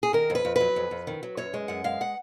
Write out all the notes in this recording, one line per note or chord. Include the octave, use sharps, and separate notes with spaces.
G#4
D#3 A#4
F2
B4
F2
F#3 B4
F2
F2
D#3
F#3
F#2 C#5
G#3
F#2 F#5
G#3 F5
F#5